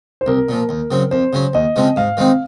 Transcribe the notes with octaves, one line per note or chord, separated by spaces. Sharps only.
C5
C2 A#4
A#2 F3
D#2
C#3 F#3 C4
F2 C5
C#3 F#3 C#4
D#2 D#5
C#3 F3 G#3 C4
G#2 F5
D#3 G#3 C4 D#4